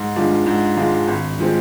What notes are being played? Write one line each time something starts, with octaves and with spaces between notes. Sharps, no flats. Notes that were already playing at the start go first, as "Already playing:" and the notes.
Already playing: G#2 C6
F3 G#3 D4 F4
G#2
F3 G#3 D4 F4
G#1
F3 G#3 C4